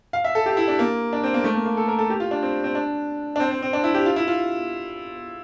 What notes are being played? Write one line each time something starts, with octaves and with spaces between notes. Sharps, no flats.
F5
E5
A4
G4
E4
D4
A#3
D4
C4
A#3
A3
A#3
A#3
A4
A#4
A4
G4
F4
D4
C4
C4
D4
D4
C4
C4
C4
D4
E4
G4
F4
E4
F4